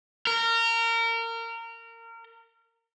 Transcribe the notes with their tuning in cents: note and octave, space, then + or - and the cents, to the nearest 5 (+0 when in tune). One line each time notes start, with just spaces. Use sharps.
A#4 -25